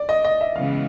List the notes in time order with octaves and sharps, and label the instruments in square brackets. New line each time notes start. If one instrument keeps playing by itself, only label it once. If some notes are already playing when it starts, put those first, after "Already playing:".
Already playing: [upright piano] D5
D#5
D#5
E5
[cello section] C#3 E3 G#3 B3 [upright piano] F5